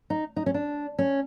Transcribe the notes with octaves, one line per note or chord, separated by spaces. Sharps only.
D#4
D#4
C#4
D4
C#4